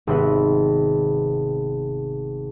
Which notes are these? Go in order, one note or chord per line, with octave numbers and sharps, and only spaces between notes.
G#1 C3 B3 B4